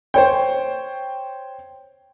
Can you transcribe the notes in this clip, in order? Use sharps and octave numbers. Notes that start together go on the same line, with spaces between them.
C5 C#5 G5